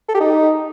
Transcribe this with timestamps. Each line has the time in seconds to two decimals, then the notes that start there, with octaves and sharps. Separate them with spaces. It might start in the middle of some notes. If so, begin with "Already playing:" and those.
0.09 A4
0.14 G4
0.20 D#4